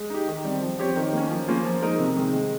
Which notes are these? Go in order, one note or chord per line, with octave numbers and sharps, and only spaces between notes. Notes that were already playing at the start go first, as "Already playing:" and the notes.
Already playing: G#3
D#4 G4
D#3
G3 C4
F3
C4 G4 C#5
D#3
A#3 C#4
F3
A#3 C#4 F4 C5
F3
G#3 D#4 A#4
C3
D#3 G#3
G#3